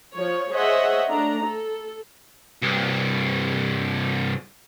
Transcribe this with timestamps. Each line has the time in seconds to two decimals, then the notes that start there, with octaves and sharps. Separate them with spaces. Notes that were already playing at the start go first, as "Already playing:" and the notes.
0.15 F3 C#5
0.50 G#4 C5 C#5 D#5 E5 F#5
1.09 A3 D4 A#5
1.43 A4
2.62 C2 G2